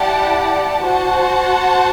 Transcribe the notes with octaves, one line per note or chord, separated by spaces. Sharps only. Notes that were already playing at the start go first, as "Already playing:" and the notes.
Already playing: E4 G4 D5 F#5 A5
F#4 C5 F#5 A5